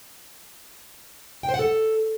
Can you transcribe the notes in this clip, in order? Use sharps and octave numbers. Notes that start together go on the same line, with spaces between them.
G5
C5
F#5
A4